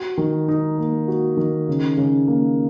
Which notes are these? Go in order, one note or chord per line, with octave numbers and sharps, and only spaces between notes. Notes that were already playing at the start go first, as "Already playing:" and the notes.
Already playing: F#4
D#3
D#4
A#3
F#4
D#3
C#3
C#3
A#3